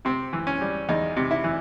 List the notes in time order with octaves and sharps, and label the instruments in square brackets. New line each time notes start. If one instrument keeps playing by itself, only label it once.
[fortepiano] C3 C4
E3
C#4
G3
E2 D#4
C3
E4
E3